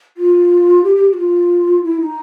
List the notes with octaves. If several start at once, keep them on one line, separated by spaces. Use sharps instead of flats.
F4
G4
G4
F#4
F4
E4
D#4